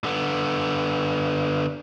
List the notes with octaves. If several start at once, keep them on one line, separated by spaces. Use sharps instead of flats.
D3 B3